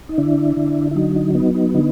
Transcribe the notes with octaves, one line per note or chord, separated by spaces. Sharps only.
D#4
D3 D4 E4
D3
E4
F#3 D#4
D#4
B3 D#4
D#4
D3 D#4